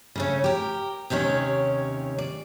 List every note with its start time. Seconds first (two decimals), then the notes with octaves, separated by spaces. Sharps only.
0.16 C#3 A3 C#4
0.44 G4 A#4
1.10 D#2 C3 D#3 C#4 C#5
2.18 D5